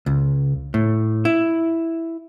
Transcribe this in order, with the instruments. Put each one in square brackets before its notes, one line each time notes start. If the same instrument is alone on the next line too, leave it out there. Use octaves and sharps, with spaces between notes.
[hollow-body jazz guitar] C#2
A2
E4